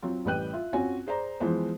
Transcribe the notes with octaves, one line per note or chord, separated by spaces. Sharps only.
F#3 C4 F4
A1 G3 B4 G5 F#6 D#7
F4 E5
C4 C#4 F4 F#4 C#5 G#5
G#4 C5 D5 A#5
E3 F3 G#3 B3 C5